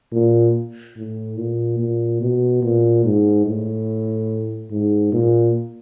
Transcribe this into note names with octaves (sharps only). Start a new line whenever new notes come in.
A#2
A2
A#2
A#2
B2
A#2
G#2
A2
G#2
A#2